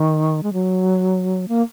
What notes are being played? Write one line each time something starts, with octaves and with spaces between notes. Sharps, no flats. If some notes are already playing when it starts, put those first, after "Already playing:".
Already playing: D#3
G#3
F#3
A#3